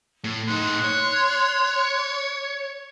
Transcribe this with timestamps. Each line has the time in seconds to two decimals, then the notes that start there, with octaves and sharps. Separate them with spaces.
0.24 A2
0.48 A2 D#4 C6 F#6
0.84 C#5